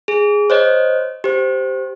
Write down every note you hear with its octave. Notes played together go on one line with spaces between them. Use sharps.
G#4
C5 C#5 D#5
G4 C5